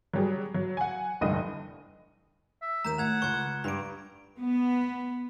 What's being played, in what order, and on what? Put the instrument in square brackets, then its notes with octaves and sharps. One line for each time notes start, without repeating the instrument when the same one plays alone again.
[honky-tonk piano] F#3 G3 G#4
F#3
F#5 G#5
F1 C2 G2 D3 D#5 D#7
[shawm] E5
[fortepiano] D#2 A#3 [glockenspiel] A#5 G6 E7
[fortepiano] A2 [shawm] F#5 [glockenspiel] G#6 F7
[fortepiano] C#2 [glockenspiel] C#6 G#6
[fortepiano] G2 D6 [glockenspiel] B5 D7
[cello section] B3